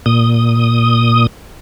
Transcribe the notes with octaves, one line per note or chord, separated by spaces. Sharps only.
A#2 D#6